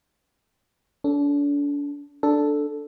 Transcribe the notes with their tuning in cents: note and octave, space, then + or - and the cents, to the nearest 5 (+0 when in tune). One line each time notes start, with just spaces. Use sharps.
D4 -40 A4 +0
D4 +0 A4 +0